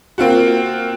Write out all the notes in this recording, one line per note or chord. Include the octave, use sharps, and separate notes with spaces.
A#3 C4 F4 F#4